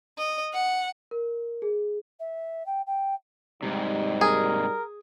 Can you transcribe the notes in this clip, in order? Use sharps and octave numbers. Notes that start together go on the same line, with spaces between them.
D#5
F#5
A#4
G#4
E5
G5
G5
G#2 C3 G3 D#4
G#4 A#4